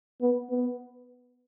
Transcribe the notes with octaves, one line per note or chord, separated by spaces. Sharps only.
B3
B3